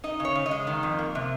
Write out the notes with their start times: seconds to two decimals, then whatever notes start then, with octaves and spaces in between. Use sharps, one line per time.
0.04 D#4 D#5
0.20 C#3
0.25 C#5
0.35 C#3
0.46 D#5
0.51 G#3
0.67 D#3
0.83 F2
0.99 A#3
1.15 C3